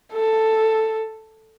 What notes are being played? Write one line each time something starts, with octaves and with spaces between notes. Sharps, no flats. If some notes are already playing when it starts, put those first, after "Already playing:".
A4